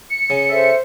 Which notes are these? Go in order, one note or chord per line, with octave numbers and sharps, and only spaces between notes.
C#7
C#3
A4 C5 E5